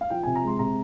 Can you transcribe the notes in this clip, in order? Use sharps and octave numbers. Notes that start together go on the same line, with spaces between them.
F5
F3 G5
C3 G#5
A#5
G#3 C6
C3 A#5